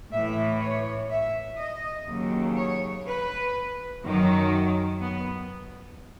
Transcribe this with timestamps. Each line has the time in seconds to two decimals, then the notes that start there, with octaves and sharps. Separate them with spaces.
0.12 A2 E3 E5
0.60 C#5
1.10 E5
1.59 D#5
2.07 D#2 C#3 F#3
2.56 C#5
3.05 B4
4.03 F#2 D#3 F#3
5.01 B3